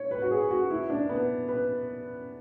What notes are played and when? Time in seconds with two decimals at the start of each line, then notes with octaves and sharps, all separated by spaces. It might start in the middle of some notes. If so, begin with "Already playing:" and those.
Already playing: C#5
0.11 B4
0.22 F#4
0.31 G#4
0.51 F#4
0.70 E4
0.90 D4
1.09 B3
1.48 B4